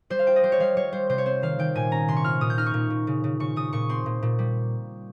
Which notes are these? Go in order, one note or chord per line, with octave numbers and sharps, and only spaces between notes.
G3 C5
F5
F4 G5
D#5
G3 C5
C#5
G3 F5
G3 C#5
G3 C5
C3 C5
C#5
C4 C5
D#3 F5
D#3 G5
A#2 G#5
C#4 A#5
C3 C6
C#6
F4 F6
A#2 D#6
G6
D#4 F6
C#6
A#2
A#2
C#3
C#3
C#3 C#6
C#3 D#6
A#2 C#6
C4 C6
A#2
A#2
G3